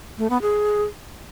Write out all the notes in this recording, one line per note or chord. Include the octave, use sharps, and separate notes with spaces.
A3
B3
G#4